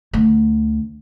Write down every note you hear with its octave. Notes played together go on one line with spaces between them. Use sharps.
D2